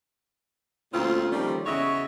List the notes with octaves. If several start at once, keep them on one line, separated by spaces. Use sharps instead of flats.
D2 A#2 C4 C#4 F4
D#3 F3 G3 A3 A#3 C#4
E2 C#3 F#4 C#5 D#5 E5